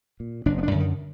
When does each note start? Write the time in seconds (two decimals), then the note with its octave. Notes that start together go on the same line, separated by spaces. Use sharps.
0.20 A#2
0.46 F#1 D4
0.58 B3
0.63 D4
0.71 F#2 D3
0.80 D#3